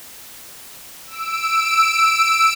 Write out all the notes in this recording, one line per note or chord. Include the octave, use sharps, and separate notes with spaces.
E6 D7